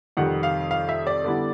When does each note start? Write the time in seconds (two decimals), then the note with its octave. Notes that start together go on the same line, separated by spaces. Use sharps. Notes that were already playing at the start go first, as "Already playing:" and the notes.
0.17 F2 C3 D#3 G3 F#5
0.43 F5
0.71 F5
0.89 E5
1.07 D5
1.24 D3 G3 B3 E4